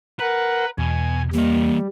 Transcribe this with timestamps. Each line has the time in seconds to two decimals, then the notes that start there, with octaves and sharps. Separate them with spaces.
0.20 A#4 B4 F#5
0.78 E2 B2 G#5
1.33 E3 G3 A#3 D#5